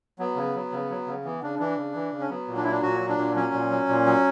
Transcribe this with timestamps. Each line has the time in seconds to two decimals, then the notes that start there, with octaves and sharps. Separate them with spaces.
0.19 F#3 B3
0.36 C#3
0.55 F#3
0.72 C#3
0.90 F#3
1.07 C#3
1.24 E3 B3
1.42 C#3 D4
1.59 E3 D4
1.77 C#3
1.94 E3
2.12 C#3
2.20 C#4
2.30 F#3 B3
2.47 A#2
2.56 D4
2.64 F#3 E4
2.72 D4
2.83 A#2 F#4
3.00 F#3
3.09 D4
3.18 A#2
3.36 F#3 C#4
3.54 A#2
3.71 F#3
3.89 A#2
4.06 F#3